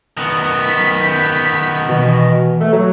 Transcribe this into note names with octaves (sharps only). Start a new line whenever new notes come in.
D#3 B3
B6
G6
B2 E3
A3
F#3